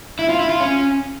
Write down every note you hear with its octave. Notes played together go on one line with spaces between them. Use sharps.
E4
F4
E4
F4
C#4